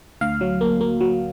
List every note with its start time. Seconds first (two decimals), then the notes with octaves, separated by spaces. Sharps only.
0.21 D2 F5
0.41 F#3
0.61 A#3
0.81 A#3
1.01 F#3